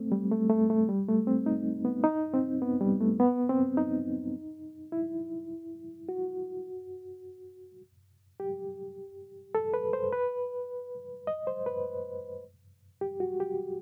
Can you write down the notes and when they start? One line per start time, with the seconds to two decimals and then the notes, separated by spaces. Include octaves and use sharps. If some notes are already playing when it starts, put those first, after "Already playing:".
Already playing: A3 C4
0.12 G3
0.32 A3
0.50 A3
0.70 A3
0.89 G3
1.08 A3
1.27 C4
1.46 D#4
1.85 B3
2.04 D#4
2.34 C4
2.62 B3
2.81 G3
3.01 A3
3.20 B3
3.49 C4
3.77 D#4
4.92 E4
6.09 F#4
8.40 G4
9.55 A4
9.74 B4
9.93 C5
10.12 B4
11.27 D#5
11.47 C5
11.66 B4
13.01 G4
13.20 F#4
13.40 G4